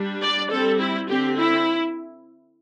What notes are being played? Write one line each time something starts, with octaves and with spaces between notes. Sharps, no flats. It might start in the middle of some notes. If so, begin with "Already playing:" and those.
Already playing: G3 D4
D5
G3 C4 A4
E4
D3 C4 G4
E4